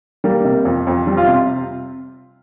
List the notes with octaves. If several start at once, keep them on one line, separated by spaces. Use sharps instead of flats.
G3 A#3
C3
F2
F2
G3
F4
C3